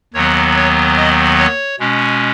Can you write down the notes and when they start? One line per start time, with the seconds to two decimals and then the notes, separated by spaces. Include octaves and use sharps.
0.14 D#2 D#3 F#3 B3 C#5
0.56 C#5
0.97 D#5
1.38 C#5
1.79 B2 G#3 C#4